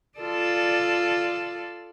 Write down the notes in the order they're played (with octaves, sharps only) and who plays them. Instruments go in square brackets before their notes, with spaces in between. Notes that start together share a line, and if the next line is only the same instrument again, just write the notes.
[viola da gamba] F4 A4 D5